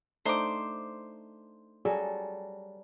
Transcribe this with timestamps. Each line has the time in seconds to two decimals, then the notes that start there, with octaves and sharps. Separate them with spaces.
0.26 A3 D4 D#4 C5 D6
1.85 F#3 G3 G#4 A4